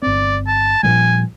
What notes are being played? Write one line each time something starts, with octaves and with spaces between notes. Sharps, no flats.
G1 C4 D5
A5
A#2 F3 G3 G#5